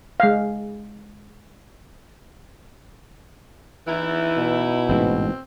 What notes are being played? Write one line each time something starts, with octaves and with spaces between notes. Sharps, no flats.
G#3 F5
E3 D#4 E4
B2
A1 G#2 E3 C4